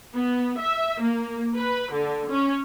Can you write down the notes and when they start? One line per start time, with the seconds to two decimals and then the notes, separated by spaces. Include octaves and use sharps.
0.15 B3
0.59 E5
1.02 A#3
1.58 B4
1.93 D3
2.31 C#4